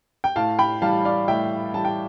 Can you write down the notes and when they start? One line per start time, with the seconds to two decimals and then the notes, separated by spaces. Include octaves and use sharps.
0.24 G5
0.36 A2 F5 A5
0.59 G5 B5
0.82 E3 G3 F5 A5
1.05 D5 F5
1.28 A2 E5 G5
1.74 E3 G3 A5
1.85 G5